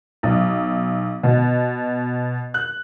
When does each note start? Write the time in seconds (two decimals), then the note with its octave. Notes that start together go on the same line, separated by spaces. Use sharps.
0.23 B1
1.23 B2
2.54 F#6